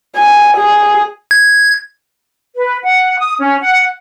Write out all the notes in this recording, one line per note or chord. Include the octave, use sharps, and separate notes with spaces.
G#5
G#4
G#6
B4
F#5
D#6
C#4
F#5